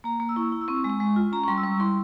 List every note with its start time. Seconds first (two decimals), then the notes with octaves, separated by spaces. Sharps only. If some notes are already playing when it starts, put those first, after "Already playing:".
0.04 A#3 A#5
0.20 A#3
0.29 E6
0.36 E4 C#6
0.52 E4
0.61 E6
0.68 C4 C#6
0.84 G#3
0.90 C#6
1.00 G#3
1.16 F4
1.32 C#4 A#5
1.44 C#6
1.48 G3 C6
1.58 E6
1.64 G3 C#6
1.80 E4 C6